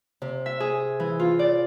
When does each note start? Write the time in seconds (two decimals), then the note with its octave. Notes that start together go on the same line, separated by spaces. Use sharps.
0.22 C3
0.46 E5
0.60 G#4
1.00 E3
1.20 F4
1.39 D5